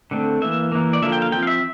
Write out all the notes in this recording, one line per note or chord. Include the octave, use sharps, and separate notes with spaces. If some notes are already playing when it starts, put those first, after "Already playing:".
D3 A3 C4
E3 A#3 E5
E3 A#3
D5
D3 F3 A#3 E5
G5
F5
F3 C4 G5
F5
E5